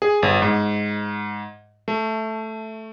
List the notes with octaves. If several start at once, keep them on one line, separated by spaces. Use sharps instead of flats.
G#4
G1
G#2
A3